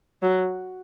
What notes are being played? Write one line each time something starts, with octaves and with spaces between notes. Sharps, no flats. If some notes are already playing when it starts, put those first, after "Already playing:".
F#3